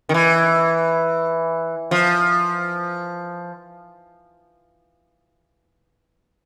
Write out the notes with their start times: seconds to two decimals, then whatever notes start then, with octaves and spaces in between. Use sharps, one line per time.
0.09 D#3
0.14 E3
1.91 F3